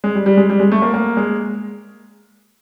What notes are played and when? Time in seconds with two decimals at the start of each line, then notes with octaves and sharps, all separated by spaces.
0.04 G#3
0.15 G3
0.26 G3
0.37 G#3
0.50 G3
0.60 G#3
0.72 A3
0.82 A#3
0.94 A#3
1.17 G#3